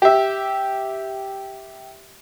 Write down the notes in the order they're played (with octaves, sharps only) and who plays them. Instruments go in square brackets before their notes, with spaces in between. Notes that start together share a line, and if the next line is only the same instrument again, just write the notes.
[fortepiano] G4 E5